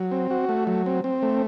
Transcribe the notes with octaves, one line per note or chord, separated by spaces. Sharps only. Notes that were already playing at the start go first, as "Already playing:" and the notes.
Already playing: F#3
C4
F#4
A3
F#3
C4
C4
A3